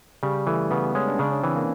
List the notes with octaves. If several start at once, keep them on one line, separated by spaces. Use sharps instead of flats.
C#3 G3
E3 A3
C#3 B3
G#3 C#4
D4
C#3 D4
C#4
E3 C4
A#3